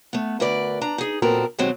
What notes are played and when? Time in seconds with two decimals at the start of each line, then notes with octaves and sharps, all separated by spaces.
0.13 A3 B3
0.40 D2 A#4 B4 D5
0.82 D4 A#5
0.98 D#4 G#4
1.22 A#2 F#3 B3 C4 A4 A#4
1.59 B2 D#3 F#3 G#3 C4 G4